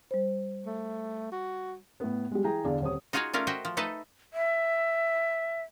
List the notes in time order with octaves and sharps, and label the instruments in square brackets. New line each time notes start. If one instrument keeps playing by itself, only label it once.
[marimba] G3 C5
[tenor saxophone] A3
F#4
[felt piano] A2 B3
G3 G#3
E3 G#4 G5 A#5
E2 D3 D5 F5
D#1 C4 C#5 D#6
[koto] D#4 F4 F#4 G#4 C#5 F5
A3 C#4 F4 A#4 D5
F#4 C5 D#5 E5 G5
F3
A3 D#4 A4 B4 D#5 A5
[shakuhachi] E5